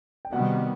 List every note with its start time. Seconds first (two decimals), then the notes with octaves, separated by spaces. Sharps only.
0.25 G5
0.32 C3 D#3 G3 B3 F#4 F#5